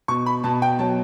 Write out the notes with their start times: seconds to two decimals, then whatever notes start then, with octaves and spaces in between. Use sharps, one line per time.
0.08 B2 C#6
0.26 B5
0.44 B2 A5
0.62 G5
0.79 F#3 A5